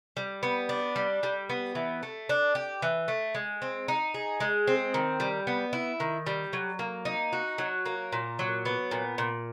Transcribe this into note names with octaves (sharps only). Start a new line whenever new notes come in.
G3
B3
D4
G3
G3
B3
E3
A3
D4
G4
E3
A3
G#3
C4
D#4
G#4
G#3
C4
D#3
G3
B3
E4
D#3
G3
F#3
A#3
D#4
F#4
F#3
A#3
A#2
F#3
B3
A#2
A#2